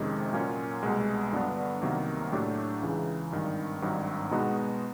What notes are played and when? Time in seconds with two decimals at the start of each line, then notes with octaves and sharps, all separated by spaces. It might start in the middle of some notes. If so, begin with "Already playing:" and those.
Already playing: F2 C3 D#3 G#3 C#4
0.33 A#2 F#3 A#3 C#4 F4
0.83 C2 B2 G#3
1.33 G2 D3 F#3 B3 D4
1.82 C2 C3 D#3 F#3 A#3
2.32 A2 F#3 A3 D4 G4
2.82 C#2 C#3 E3
3.32 G#1 G2 D#3
3.82 G#1 G2 D#3 F#3
4.31 B2 G#3 B3 D#4 F#4